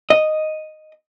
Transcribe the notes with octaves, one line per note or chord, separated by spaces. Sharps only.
D#5